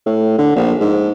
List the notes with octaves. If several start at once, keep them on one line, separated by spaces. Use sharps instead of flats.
A2
D3
A#1
G#2